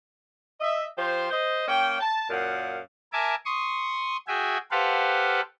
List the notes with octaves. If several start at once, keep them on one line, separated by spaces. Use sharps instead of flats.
D#5 E5
F3 G4 C5
C5 D#5
A#3 C#4 G5
A5
F#2 A#2 F5 F#5
A#4 E5 G#5 A5 D6
C6 C#6 D#6
F#4 G#4 E5 G5 G#5
G4 A4 B4 C5 F5 F#5